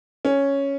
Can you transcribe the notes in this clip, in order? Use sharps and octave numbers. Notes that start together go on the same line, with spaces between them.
C#4